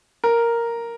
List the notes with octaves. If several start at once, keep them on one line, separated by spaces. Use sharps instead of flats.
A#4